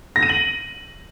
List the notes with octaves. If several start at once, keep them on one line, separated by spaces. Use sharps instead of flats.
A#6
D#7
F#7